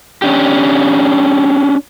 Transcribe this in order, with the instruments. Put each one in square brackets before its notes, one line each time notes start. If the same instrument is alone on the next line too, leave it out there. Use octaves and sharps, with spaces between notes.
[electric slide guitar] C#4 D4 G4